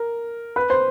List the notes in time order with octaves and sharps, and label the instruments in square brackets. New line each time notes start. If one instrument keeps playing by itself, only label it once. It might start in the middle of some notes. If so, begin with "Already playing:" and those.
Already playing: [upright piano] A#4
B4
C5